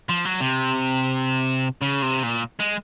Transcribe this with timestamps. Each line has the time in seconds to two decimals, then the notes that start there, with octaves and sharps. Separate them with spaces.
0.09 F3
0.25 F#3
0.41 C3
1.82 C#3
2.03 C3
2.23 A#2
2.60 G#3